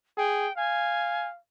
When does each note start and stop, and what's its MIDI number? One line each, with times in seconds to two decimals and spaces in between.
0.17 0.48 68
0.17 0.55 79
0.57 1.38 77
0.57 1.28 80